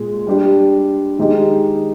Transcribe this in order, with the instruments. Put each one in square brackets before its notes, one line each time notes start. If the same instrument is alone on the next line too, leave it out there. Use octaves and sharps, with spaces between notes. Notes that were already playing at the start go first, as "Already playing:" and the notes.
Already playing: [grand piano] A#2 G#3
G3 D4 G4
D#3 G#3 D#4 G4